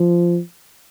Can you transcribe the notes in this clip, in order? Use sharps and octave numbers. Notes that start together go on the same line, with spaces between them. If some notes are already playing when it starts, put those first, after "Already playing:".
Already playing: F3